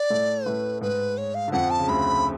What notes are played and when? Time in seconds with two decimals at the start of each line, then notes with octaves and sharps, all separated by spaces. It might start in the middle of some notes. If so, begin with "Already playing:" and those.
Already playing: D5
0.10 A2 A3
0.46 A2 A3 B4
0.81 G#2 G#3 B4
1.18 C#5
1.35 F5
1.48 D3
1.52 F2 F3 F#5
1.70 A5
1.79 C#3
1.88 D2 D3 B5